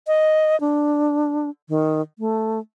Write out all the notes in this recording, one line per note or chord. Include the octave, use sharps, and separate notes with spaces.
D#5
D4
D#3
A3